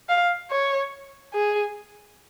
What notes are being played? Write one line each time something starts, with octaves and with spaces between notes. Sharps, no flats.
F5
C#5
G#4